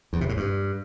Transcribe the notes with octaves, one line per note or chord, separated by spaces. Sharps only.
E2
C3
A2
G2